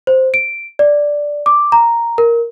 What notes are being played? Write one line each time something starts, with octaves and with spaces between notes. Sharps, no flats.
C5
D7
D5
D6
A#5
A#4